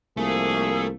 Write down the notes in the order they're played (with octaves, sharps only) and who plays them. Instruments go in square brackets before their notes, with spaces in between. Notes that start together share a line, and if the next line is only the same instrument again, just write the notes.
[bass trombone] C2 [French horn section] F3 A#3 [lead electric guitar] A3 [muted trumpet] G#4